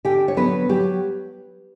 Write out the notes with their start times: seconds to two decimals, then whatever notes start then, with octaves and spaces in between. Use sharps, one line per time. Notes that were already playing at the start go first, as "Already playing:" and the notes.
0.05 D3 G4 G5
0.28 C#5
0.37 F#3 B3 B4
0.69 F#3 G4